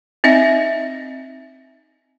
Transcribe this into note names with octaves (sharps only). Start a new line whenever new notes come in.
C4 D#4 D#5 E5